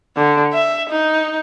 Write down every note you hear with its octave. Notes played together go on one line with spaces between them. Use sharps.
D3
E5
D#4